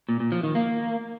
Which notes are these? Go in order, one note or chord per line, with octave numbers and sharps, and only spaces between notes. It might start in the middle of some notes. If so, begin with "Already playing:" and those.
A#2
A#2
F3
D#3
A#3